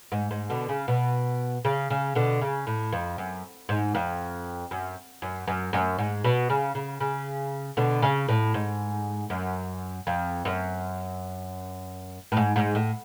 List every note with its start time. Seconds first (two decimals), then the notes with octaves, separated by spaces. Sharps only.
0.12 G#2
0.31 G#2
0.50 B2 D3
0.69 C#3
0.88 B2
1.65 C#3
1.90 C#3
2.15 B2 D3
2.41 C#3
2.67 A2
2.92 F2
3.18 F#2
3.69 G#2
3.95 F2
4.71 F#2
5.22 F#2
5.47 F#2
5.73 F#2
5.99 G#2
6.24 B2
6.50 C#3
6.75 C#3
7.00 C#3
7.77 B2 D3
8.02 C#3
8.28 A2
8.54 G#2
9.30 F#2
10.07 F2
10.45 F#2
12.32 A2
12.37 G#2
12.56 G#2
12.75 A2